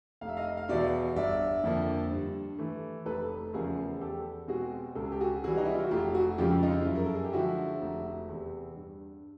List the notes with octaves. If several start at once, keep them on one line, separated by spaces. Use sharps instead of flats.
F1 F5
E5
D#5 F5
F5
E2 B2 D5 E5
G1 D5 E5
F2 D3 F3 A#3
G2
E3 A3
F1 A4 B4
A4
E2 C#3 F3 A3 G#4 A#4
E2 G4 A4
B2 G#3 C4 F#4 G#4
C#2 A4
G#4
G4
F#4 G#4
C3 E3 G3 F#4 G#4
D#4
E4
F4
F#4
F1 F4 G4
F#4 G#4
F2 C#3 F3 G#3 F4 G4
D#4 F4
F4
F#2 E4
A#4
A4
G#4
G4
D3 F3 G#3 E4 F#4
F1
E2 C3
G2